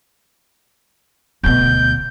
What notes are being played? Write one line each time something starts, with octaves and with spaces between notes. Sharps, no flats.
D2 B2 G6